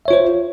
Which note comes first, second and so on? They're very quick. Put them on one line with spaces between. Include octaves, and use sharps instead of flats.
E5 C#5 F4 C5